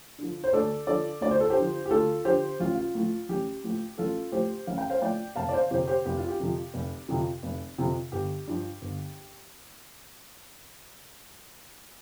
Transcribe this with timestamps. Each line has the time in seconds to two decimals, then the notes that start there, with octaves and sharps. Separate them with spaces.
0.18 D3 F3
0.44 C5
0.53 D2 A4 D5
0.87 D3 F3 A4 D5
1.21 D2 D5
1.31 C5
1.40 A4
1.50 G4 C5
1.56 D3 F3
1.86 G4
1.91 D2 F4 A4
2.25 D3 F3 G4 C5
2.60 A1 F4
2.75 F4
2.95 A2 F3
3.29 A1 G4
3.64 A2 F3
3.98 A1 F4 A4
4.32 A2 F3 G4 C5
4.67 A1 F5
4.78 G5
4.90 C5 F5
5.02 A2 F3 D5 G5
5.36 F1 F5 A5
5.49 D5
5.53 C5 F5
5.71 F2 C3 F3 G4 C5
5.87 G4 C5
6.05 F1 G4
6.18 F4
6.28 G4
6.40 F2 C3 F3
6.74 F1
7.08 F2 C3 F3
7.43 F1
7.78 F2 C3 F3
8.12 G1 G4
8.47 G2 F3
8.81 G1